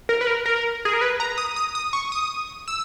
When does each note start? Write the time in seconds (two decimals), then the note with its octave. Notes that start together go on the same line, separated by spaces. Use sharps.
0.09 A#4
0.21 B4
0.27 A#4
0.46 A#4
0.85 G#4
0.93 A#4
1.01 B4
1.20 A#5
1.38 D#6
1.56 D#6
1.75 D#6
1.93 C#6
2.12 D#6
2.68 E6